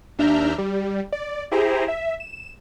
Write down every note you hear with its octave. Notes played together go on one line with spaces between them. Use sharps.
D#2 D4 E5 A#5 F6 G6
G3
D5
E4 G4 G#4 C5 A#5
E5
E7